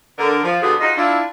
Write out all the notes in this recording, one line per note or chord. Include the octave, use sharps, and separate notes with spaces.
D3 A#4
F3
D3 G3 A3 B3 F#4 G#4
D#4 F4 F#4 G#4 D#5
D4 E4 F4